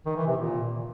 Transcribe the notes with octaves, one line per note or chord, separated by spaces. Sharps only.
D#3
E3
C3
A#2